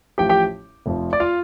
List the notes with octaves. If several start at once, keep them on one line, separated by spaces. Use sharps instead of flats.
A1 A2 F3 G4 G5
G4 G5
F1 F2 F3
D5
F4 F5